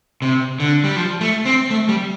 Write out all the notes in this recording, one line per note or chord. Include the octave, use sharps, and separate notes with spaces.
C3
D3
G3
F3
A3
C4
A3
G3